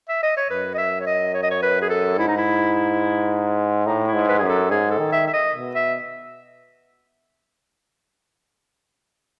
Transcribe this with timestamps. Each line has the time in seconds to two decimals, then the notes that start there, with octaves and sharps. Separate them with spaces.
0.09 E5
0.23 D#5
0.37 C#5
0.50 F#2 B4
0.74 D#5
0.78 E5
1.00 C#5
1.07 D#5
1.34 C#5
1.43 D#5
1.51 C#5
1.62 B4
1.82 G#4
1.89 A4
2.18 G#2 E4
2.28 D#4
2.37 E4
3.86 A2 D#4
4.07 E4
4.14 G#2
4.28 B4
4.38 F#2 G#4
4.49 A4
4.71 G#2 G#4
4.91 A4
4.99 D#3
5.12 E5
5.27 E5
5.34 D#5
5.54 B2
5.75 E5